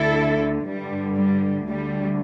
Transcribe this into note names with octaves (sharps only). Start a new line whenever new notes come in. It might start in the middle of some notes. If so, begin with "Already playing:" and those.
Already playing: D2 D3 E4 A4
G2 D3 G3
G3
D2 D3 G3